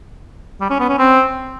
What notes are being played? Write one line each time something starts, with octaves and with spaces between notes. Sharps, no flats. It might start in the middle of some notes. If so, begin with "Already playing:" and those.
G3
C#4
B3
C#4
C4